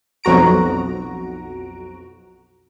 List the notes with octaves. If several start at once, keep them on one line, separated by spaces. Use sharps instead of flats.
B1 F2 F#4 A#5 D7